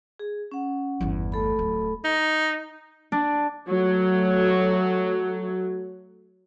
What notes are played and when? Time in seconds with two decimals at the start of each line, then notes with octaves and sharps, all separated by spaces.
0.19 G#4
0.52 C#4 F#5
1.01 G1 E2
1.32 A3 A4 B5
1.59 D1
2.05 D#4
3.12 D4
3.68 F#3 A3